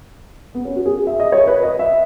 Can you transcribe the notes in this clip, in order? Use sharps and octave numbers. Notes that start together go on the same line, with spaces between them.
B3
C#4
F#4
G#4
E5
D#5
C#5
B4
D#5
E5